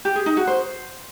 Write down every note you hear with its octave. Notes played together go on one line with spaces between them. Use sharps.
G4
G#4
D#4
F#4
C5